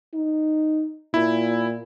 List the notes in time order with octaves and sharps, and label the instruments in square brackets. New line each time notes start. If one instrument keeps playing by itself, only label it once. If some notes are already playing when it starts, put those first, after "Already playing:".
[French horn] D#4
[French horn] A#2 [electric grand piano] E4